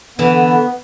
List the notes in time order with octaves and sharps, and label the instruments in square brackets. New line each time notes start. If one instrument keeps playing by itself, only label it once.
[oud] D3 E3 [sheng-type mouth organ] B3